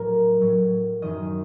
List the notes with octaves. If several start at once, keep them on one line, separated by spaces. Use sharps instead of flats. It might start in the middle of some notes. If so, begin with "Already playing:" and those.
Already playing: A2 F#3 A#4
A2 F#3
F#2 D#3 F#3 D#5